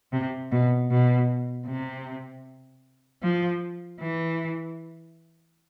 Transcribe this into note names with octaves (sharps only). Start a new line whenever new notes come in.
C3
B2
B2
C3
F3
E3